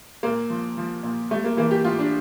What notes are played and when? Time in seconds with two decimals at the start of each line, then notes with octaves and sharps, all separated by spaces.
0.23 A#2 A#3
0.50 F3
0.77 F3
1.03 A#2
1.31 G3 A3
1.44 A#3
1.57 E3 A#3
1.71 G4
1.84 A2 F4
1.99 D4